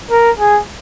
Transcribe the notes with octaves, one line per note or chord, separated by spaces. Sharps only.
A#4
G#4